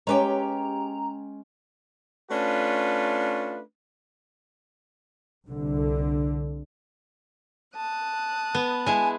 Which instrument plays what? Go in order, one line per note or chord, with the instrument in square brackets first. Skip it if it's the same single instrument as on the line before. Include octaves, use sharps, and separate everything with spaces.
[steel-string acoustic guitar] G#3 C#4 G5 [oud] G4 B4 C#5 [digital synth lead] A#5
[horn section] A3 C#4 D4 F4 B4
[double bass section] C2 D3
[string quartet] A5 D#6 F#6
[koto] B3
[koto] G#3 E4 [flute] G#5